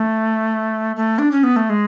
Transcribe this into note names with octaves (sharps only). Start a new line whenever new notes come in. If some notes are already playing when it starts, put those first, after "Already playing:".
Already playing: A3
A3
D4
C#4
B3
A3
G#3